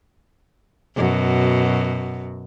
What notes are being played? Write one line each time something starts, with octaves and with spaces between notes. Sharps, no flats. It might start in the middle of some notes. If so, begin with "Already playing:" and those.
F#2 B2